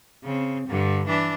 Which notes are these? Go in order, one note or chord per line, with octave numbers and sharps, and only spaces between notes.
C#3 C4
G2 D3
E3 D4